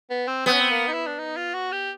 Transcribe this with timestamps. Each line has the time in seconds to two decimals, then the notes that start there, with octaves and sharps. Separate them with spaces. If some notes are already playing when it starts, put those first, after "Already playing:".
0.11 B3
0.27 C4
0.46 B3 C4
0.53 C#4
0.60 C4
0.71 A#3
0.87 D#4
0.94 E4
1.07 D4
1.18 D#4
1.37 F4
1.54 F#4
1.72 G4